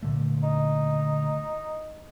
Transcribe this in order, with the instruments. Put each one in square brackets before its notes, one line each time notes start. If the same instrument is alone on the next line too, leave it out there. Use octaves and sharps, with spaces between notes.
[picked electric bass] A#2 D3 A3
[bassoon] D#4